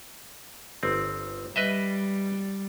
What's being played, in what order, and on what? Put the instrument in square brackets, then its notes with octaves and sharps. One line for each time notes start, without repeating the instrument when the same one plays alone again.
[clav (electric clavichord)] G1 C4
[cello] G3 [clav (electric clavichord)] B4 D#5 E5